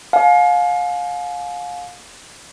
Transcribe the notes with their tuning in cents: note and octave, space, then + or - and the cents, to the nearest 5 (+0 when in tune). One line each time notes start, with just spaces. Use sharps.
F5 +30 G#5 +40